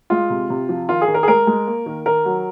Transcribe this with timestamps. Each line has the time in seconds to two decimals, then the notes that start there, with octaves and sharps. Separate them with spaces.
0.10 G#3 F4
0.30 C3
0.50 C3
0.69 F3
0.89 D#3 F4
1.01 G#4
1.08 D#3
1.14 A#4
1.23 G#4
1.28 G#3 A#4
1.47 G#3
1.67 A#3
1.86 D#3
2.06 D#3 A#4
2.25 F#3